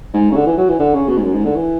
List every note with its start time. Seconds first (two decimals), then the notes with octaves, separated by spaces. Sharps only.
0.14 G#2
0.32 C#3
0.36 D3
0.46 E3
0.57 F#3
0.69 E3
0.79 D3
0.93 C#3
1.08 B2
1.17 G#2
1.23 F#2
1.34 G#2
1.45 D3
1.55 E3